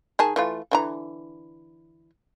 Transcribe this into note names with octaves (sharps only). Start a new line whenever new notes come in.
D#3 G#4 A5
E3 A3 F4
D3 E3 A#5